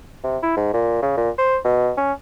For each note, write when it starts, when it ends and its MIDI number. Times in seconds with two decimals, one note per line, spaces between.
0.24 0.38 48
0.43 0.56 64
0.57 0.70 44
0.74 0.99 46
1.02 1.15 49
1.17 1.30 46
1.38 1.57 72
1.64 1.92 47
1.97 2.13 61